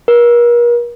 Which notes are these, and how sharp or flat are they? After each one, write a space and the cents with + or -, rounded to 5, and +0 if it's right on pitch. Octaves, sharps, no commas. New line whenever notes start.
A#4 +40